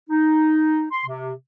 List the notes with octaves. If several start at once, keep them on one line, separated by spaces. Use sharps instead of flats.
D#4
C6
C3